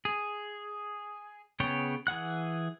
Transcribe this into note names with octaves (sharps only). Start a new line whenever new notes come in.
G#4
C#3 B3 G#4 C#5 G5
E3 G#4 F#5 F#6